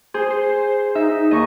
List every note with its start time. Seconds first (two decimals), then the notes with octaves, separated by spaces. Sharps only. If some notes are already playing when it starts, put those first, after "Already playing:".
0.14 G#4 C5
0.31 C5
0.95 D#4 E5
1.31 D#2 D#5 C#6